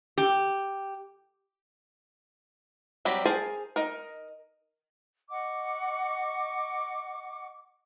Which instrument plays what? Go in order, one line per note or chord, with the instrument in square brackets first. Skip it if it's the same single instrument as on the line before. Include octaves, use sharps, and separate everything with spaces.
[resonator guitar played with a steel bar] G4
[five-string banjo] F#3 G3 C4 G4 B5
G#4 A#4 C5 G#5 A5
D#4 A#4
[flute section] D#5 F#5 C#6 D6